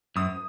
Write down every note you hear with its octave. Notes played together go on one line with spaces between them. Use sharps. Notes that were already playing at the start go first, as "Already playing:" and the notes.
F#2 D#6